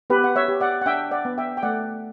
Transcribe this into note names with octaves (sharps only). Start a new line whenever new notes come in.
B3 G4 B4
F#5
C#5 E5
G4
D5 F#5
F#5
D4 E5 G5
D5 F#5
B3
E5 G5
G5
A3 D5 F#5